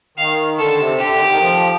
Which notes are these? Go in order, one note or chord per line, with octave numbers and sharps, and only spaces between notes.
D#3 F5
D3 A4
C3
D3 G4
D#3
D#3
F3